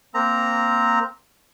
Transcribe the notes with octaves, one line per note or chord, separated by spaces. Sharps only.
A#3 C4 A#5